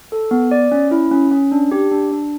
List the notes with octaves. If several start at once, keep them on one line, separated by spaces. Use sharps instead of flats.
A4
B3
D5
C#4
E4
C#4
C#4
D4
G4
D4
D4